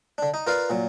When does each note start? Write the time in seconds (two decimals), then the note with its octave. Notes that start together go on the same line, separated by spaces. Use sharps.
0.18 D3 D4
0.34 D#4
0.47 F4 A#4 B4 D5 F5
0.70 A#2 F#3